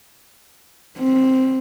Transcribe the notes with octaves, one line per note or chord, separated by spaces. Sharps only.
C4